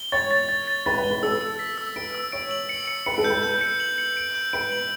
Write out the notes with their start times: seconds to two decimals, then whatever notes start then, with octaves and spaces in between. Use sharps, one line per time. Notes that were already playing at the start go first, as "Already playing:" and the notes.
Already playing: G7
0.12 C#5 A6
0.31 A6
0.49 A6
0.68 A6
0.86 B4 A6
0.98 B4
1.04 G7
1.11 B4
1.23 A4 E6
1.41 E6
1.59 B6
1.78 E6
1.96 B4 D7
2.15 E6
2.32 C#5 D7
2.51 F#7
2.69 C#7
2.88 C#7
3.06 B4 C#7
3.18 A4
3.24 G6
3.30 B4
3.43 G6
3.61 C#7
3.80 F#7
3.98 C#7
4.17 D7
4.35 G6
4.53 B4 D7
4.72 F#7